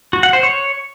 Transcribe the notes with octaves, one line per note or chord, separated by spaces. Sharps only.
F#4
F#5
C5
C#5